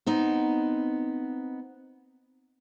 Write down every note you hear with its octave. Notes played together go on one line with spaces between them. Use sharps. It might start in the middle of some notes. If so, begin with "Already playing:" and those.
B3 C4 D#4